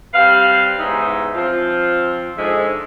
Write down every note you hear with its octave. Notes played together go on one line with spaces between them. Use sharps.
G3 C4 B4 F5
E2 G#2 C#3 E3 D#4 E5
F3 C4 F4
G#2 D3 F3 G#3 G#4 E5